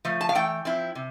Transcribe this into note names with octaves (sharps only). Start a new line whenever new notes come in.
F3 A3
A5
F5
E3 A3 G5
F3 C4 E4
C3